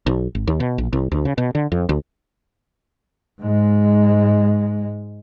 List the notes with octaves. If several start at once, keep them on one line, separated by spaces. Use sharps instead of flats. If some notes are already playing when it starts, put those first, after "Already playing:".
B1
G#1
D#2
B2
A#1
C2
D2
C#3
B2
D3
F2
D2
G#2 G#3